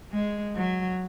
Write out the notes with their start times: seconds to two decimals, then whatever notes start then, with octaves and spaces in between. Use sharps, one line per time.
0.12 G#3
0.56 F#3